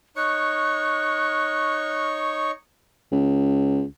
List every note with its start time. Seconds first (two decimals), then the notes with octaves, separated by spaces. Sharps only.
0.17 D#4 C#5 C#6 F#6
3.12 C#2